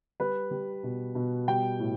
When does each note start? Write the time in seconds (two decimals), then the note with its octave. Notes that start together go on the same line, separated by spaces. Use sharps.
0.20 G3 B4
0.51 G3
0.83 B2
1.15 B2
1.48 G3 G5
1.80 A2